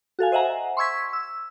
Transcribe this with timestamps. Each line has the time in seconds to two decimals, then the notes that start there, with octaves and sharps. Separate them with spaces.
0.19 F#4 A4 F5 G#5
0.32 C5 D#5 E5 F#5 G#5 A#5
0.77 C6 C#6 E6 G#6 B6
1.13 E6